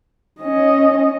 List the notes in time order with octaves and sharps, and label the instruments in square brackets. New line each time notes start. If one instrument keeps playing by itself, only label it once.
[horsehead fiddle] C#4 D#5